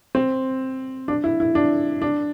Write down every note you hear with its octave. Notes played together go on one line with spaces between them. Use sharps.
C4
D4
E4
E4
D4
D4